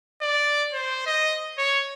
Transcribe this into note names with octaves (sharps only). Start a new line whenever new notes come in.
D5
C5
D#5
C#5